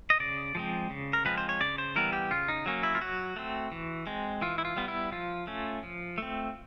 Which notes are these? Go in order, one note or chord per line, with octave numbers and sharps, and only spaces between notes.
D#5
C#3 D5
F3 G#3 C4
C#3
A#4
F3 G#3 C4 B4
C5
C#5
C#3 D5
C5
E3 G3 B3 A#4
G4
C#3 F4
D#4
F#3 A#3 C#4
E4
F4
F#3 F#4
A3 C4
E3
G#3 C4
E3 F4
E4
F4
G3 B3
E4
F3 F4
A3 C#4
F3
A3 C4